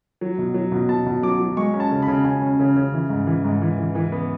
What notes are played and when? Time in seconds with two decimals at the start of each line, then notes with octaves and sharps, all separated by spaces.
0.21 F#3
0.38 B2
0.54 F#3
0.72 B2
0.89 B2 A5
1.06 B2
1.23 F#3 D6
1.40 F#3
1.57 G#3 C#6
1.74 C#4
1.80 A5
1.91 C#3
2.02 B5
2.08 C#3
2.25 C#3 G#5
2.42 C#4
2.60 C#3
2.77 C#3
2.93 E3
3.10 G#2
3.27 E3
3.45 G#2
3.62 E3
3.78 E3
3.95 E3
4.12 B3